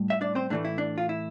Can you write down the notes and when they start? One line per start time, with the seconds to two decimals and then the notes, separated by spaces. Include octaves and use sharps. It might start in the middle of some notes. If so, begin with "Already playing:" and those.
Already playing: A2 G3
0.10 E5
0.21 D4 D5
0.35 C4 C5
0.50 A2 E3 A3 D4
0.65 E4
0.78 D4
0.98 F4
1.09 E4